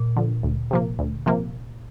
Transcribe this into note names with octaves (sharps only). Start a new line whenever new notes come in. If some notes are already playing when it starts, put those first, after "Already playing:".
Already playing: A#2
D3 F3
D2
C3 F3 A#3
D2
C3 F3 A#3